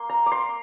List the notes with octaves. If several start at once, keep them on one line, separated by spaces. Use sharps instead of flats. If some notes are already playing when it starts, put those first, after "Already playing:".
Already playing: A#3 C6
A#5
D6
C6